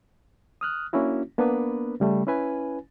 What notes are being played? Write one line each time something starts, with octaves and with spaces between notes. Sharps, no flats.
D#6 F6 F#6
A#3 C#4 D4 E4 F#4
A#3 B3 D4 A#4 B4
C#3 G3 A3
C#4 E4 B4 G#5